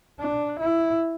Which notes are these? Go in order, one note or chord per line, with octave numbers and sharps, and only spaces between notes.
D4
E4